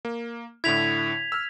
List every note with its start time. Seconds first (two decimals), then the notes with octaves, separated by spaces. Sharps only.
0.05 A#3
0.64 A2 D3 E4 G#6 B6 F7
1.32 E6 F6